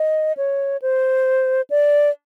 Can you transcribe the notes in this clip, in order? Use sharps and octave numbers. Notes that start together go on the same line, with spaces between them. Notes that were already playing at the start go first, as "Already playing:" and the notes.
Already playing: D#5
C#5
C5
D5